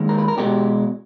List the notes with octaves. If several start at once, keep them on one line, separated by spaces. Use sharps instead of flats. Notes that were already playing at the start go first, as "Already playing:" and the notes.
Already playing: D#2 D#3 G#3
A#4
B4
A#4
B2 G#3 G4